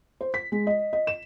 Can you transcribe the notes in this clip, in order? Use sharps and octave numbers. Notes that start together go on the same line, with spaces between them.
C5
B6
G#3
D#5
D#5
E7